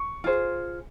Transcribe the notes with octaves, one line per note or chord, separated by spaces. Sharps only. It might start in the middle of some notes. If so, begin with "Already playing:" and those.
Already playing: C#6
F4 G#4 C5